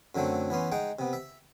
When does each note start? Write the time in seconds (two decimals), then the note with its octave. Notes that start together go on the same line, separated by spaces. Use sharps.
0.15 F#2 D3 F#3 A3 C4
0.50 E3 B3 C#4 C6
0.72 G#3 D#4 F#5 G5
0.99 C3 B3
1.13 E5